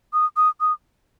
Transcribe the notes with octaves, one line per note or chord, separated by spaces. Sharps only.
D#6
D#6
D#6